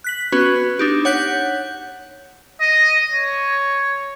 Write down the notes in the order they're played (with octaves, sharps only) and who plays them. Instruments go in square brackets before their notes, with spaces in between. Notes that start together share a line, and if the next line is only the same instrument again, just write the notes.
[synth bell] F#6 B6 F#7
B3 C#4 F#4 B4
D4 D#4 G4
C#5 F#5 F#6 G6 B6
[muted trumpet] D#5
C#5